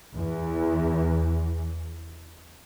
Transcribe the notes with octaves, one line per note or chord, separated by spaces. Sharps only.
E2